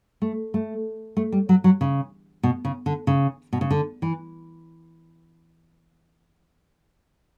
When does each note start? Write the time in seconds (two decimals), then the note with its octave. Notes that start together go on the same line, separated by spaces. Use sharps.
0.22 A3
0.54 A3
1.17 A3
1.32 G3
1.49 F#3
1.64 F#3
1.81 C#3
2.43 B2
2.65 C#3
2.86 D3
3.07 C#3
3.53 B2
3.61 C#3
3.71 D3
4.02 E3